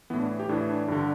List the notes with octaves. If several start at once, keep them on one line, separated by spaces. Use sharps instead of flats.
A2 E3 B3
D4
G4
A2 E3 D4
D4
G2 D3